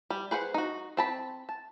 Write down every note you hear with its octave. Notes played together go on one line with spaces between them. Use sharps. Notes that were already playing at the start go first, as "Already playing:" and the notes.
G3
G#4 B4 C5 F#5
D#4 F#4
C4 A5 B5
A5